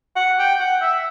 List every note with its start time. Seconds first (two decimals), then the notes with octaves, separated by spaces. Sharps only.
0.16 F#5
0.39 G5
0.60 F#5
0.82 E5